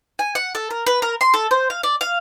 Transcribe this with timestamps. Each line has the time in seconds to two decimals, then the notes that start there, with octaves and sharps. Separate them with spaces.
0.19 G#5
0.35 F#5
0.55 A4
0.71 A#4
0.87 B4
1.02 A#4
1.21 C6
1.34 A4
1.51 C5
1.70 F5
1.83 D5
2.01 F5